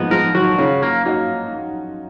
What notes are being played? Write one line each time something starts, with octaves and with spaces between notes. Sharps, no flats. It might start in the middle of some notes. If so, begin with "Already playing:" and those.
Already playing: F3 G#3 A#3 B3 D#4
F3 G#3 A#4
D#3 F#3 F#4
C#3 C#4 F4
A#3
A#3 D#4 F#4